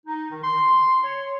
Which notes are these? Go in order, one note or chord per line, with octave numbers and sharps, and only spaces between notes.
D#4
D#3
C6
C#5